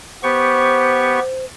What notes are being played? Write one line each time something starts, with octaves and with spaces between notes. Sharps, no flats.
B3 G4 C5 C#6